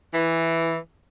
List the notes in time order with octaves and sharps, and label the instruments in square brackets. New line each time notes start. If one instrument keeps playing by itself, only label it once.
[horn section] E3